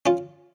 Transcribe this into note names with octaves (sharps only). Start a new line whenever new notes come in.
C#4 F4